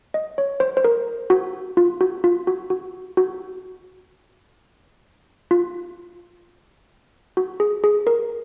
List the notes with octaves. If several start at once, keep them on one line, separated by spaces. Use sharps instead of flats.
D#5
C#5
C5
C5
A#4
F#4
F4
F#4
F4
F#4
F#4
F#4
F4
F#4
G#4
G#4
A#4